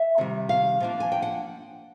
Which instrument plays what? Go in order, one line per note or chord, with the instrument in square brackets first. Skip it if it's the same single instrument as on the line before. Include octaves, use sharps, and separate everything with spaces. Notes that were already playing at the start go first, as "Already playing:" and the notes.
Already playing: [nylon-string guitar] E5
C3 D#3 G3
F5
F3 A#3 D4
G#5
G5
F#5